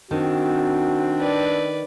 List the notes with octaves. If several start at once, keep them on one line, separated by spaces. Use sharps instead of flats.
D#3 C4 D4 F#4
B4 D5